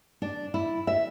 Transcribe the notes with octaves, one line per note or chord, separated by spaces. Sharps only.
D4
E4
E5